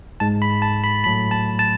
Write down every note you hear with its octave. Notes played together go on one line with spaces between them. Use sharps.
G#2 G#3 A5
B5
A5
B5
A2 F#3 A3 B5
A5
A5